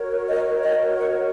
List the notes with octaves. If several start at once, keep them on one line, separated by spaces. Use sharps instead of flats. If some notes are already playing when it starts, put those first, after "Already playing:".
Already playing: F#4 A#4 C#5
D#5
D#5
F#5